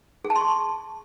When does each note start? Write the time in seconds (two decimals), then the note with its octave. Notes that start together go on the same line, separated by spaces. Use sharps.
0.25 G#4
0.30 A5
0.36 C6
0.41 C#6